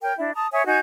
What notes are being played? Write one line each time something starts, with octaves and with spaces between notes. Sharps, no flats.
A#4 C#5 G5
D4 E4
A5 A#5 D#6
C#5 E5 G#5 D#6
D#4 F#4 G#5 G6